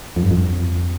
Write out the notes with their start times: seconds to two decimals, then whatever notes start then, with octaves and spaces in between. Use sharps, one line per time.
0.16 F2
0.23 G2
0.31 F2